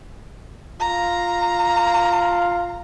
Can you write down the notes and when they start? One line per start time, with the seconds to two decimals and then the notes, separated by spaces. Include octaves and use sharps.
0.80 F4 A#5